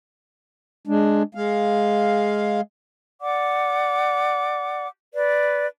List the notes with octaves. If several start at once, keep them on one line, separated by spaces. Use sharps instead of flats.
G#3 D4
G#3 F5
D5 F#5 D6
B4 D5